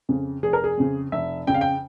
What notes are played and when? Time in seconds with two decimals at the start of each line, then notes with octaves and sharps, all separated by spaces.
0.09 F2 C#3
0.43 F1 G#4
0.53 A#4
0.64 G#4
0.77 F2 C#3
1.12 F1 E5
1.47 F2 C#3 G5
1.54 F5
1.61 G5